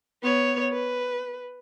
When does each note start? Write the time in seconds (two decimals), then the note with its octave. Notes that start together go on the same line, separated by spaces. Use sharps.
0.22 B3 C#5
0.72 B4